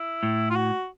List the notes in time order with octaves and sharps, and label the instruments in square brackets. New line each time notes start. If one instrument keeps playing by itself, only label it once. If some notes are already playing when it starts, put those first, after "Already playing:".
Already playing: [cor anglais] E4
[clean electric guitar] A2
[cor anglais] F4
F#4